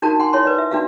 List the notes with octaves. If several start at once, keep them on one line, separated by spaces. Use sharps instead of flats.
D4 D#4 F#4 A#4 A5
F#5 G#5 C6
E4 C#5 C6
B4 D5
E5
D4 D#4 F#4 E5 F5